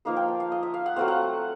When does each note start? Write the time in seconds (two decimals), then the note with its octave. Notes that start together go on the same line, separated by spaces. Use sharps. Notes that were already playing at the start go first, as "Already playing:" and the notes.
0.05 F3 A#3 D#4 F5
0.16 G5
0.28 A5
0.40 F5
0.52 D#5
0.63 E5
0.74 F5
0.86 F#5
0.96 F#3 A3 C4 F5
1.08 F#5